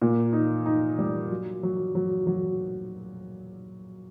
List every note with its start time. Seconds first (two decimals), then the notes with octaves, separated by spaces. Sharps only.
0.02 A#2
0.33 D#4
0.66 D#4
0.99 G3
1.31 F#3
1.63 F#3
1.95 F#3
2.27 F#3